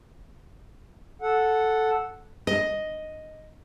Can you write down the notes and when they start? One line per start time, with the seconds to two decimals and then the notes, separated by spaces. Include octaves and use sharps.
1.22 A4 F#5
2.47 D#5